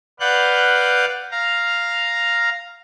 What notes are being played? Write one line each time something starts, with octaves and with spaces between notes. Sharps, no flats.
B4 D5 F5 F#5 F#6 G6
F5 A#5